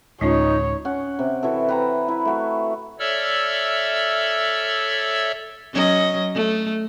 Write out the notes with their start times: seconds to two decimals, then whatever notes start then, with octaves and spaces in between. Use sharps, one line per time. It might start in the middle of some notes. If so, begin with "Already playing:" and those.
0.21 D1 G#3 C#4 D#4 F4 C#5
0.85 C#4 F#5
1.19 C3
1.43 E3 F#4 A4
1.69 B4 E5 G5 A#5
2.08 E4
2.25 A3 F#4
2.99 A4 C#5 D5 E5 E6 F6
5.73 F#3 C#4 D#5
6.34 A3